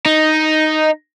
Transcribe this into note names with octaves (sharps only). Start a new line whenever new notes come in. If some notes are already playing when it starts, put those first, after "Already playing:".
D#4